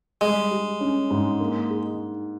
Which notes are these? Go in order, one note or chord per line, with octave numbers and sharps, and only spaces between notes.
G3 G#3
G4
C#4
G#2
A#3
G#4